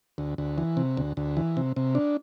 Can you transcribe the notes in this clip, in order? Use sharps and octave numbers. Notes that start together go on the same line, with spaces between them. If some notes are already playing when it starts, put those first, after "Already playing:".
D2
D2
E3
C3
D2
D2
E3
C3
C3
D4